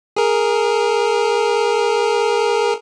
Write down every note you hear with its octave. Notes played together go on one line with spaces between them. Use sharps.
G#4 A#4